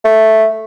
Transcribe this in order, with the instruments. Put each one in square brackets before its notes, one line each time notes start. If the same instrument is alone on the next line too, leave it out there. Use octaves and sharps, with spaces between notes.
[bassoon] A3